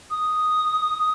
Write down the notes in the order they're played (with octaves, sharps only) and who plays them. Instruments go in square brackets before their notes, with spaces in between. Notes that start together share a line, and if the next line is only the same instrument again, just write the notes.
[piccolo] D#6